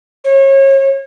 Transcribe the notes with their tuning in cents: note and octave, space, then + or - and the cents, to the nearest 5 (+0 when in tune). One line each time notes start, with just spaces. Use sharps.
C#5 -35